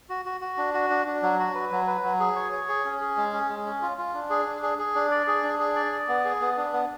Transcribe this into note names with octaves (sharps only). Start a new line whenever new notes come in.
F#4
F#4
F#4
D4
F#4
D4
D4
F#3
F#4
B4
F#3
B4
F#3
G#4
C#5
C#5
G#4
C#4
G#4
G#3
C#4
G#3
C#4
F4
F4
D4
G#4
D4
G#4
G#4
D4
D5
G#4
D4
G#4
D5
D5
B3
G#4
B3
D4
B3